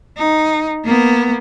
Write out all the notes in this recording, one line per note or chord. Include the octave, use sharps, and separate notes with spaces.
D#4
A#3 B3